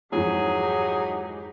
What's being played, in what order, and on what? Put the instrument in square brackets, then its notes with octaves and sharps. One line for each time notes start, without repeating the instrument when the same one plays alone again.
[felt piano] F2 G#2 E3 [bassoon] F#3 [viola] D#4 G4 [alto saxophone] G#4